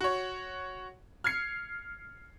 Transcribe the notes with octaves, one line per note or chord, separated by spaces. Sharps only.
F#4 C#5
F6 G#6 C7 C#7